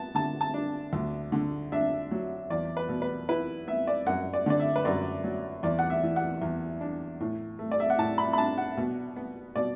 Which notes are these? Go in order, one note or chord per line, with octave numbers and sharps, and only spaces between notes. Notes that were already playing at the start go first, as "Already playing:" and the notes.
Already playing: B3 A5
D3 A5
A5
D4
D2
D3
D4 E5
F#3
E2 D5
B4
B2
B4
E4 B4
B3 E5
D5
F#2 F#5
D5
D3 D5
E5
B4
F#2 D5
F#3
E2 D5
F#5
E5
E3
F#5
E2
D4
A2
A3
D5
E5
F#5
A2 A5
B5
B5
D4 A5
F#5
B2
B3
B2 D5